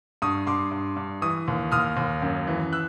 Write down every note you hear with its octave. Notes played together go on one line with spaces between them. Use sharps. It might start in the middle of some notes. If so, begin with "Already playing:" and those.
G2 C#6 D#6
G2 C6 D6
G2
G2
E3 C#6 D#6
D#2
D#2 D#6 F6
D#2
F#2
E3
E6 F#6